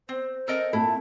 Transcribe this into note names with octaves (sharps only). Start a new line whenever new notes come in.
C4 C5
C4 A4 A#4 D#5
A#2 A3 E4 A5